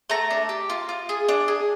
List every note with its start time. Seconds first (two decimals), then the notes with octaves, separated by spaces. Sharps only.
0.10 A3 A#5
0.30 D4
0.49 G4
0.70 F4
0.89 F4
1.09 G#4
1.29 D4
1.48 G#4